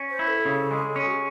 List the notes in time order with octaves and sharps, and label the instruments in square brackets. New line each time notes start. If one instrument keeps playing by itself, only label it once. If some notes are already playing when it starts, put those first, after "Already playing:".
Already playing: [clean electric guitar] C#4
[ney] C5
[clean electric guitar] E4
[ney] A4
[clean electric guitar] C#3
G#3
[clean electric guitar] C#4 [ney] G#4
[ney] F#4
G#4